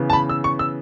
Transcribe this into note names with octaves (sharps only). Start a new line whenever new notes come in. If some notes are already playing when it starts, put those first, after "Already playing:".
Already playing: C#3 E3 B3
A5
B5
E6
C#6
E6